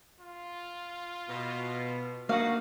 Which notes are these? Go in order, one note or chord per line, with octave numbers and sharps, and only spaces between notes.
F4
B2
A#3 D4 D#4 F#4 F5